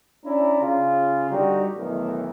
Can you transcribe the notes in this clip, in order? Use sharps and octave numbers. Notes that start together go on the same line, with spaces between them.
C#4 D4 E4 D5 A#5
C#3 F4
D3 G3 D#4 F#4 G4
B1 A2 D#3 E3